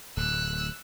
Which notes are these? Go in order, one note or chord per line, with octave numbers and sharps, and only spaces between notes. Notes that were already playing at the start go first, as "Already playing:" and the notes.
D1 A2 E6 F#6